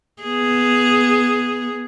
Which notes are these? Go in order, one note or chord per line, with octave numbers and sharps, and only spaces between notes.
B3 G#4